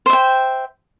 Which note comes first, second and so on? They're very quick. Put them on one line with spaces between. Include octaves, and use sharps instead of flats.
C5 E5 G5